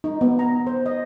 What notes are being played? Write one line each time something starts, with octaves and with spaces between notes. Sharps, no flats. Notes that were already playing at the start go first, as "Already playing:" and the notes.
D#4
B3
A#5
C5
D#5